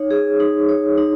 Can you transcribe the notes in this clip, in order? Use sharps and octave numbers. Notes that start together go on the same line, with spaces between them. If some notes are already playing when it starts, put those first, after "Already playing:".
Already playing: D#4 C#5
G#4
D#4
C#5
D#4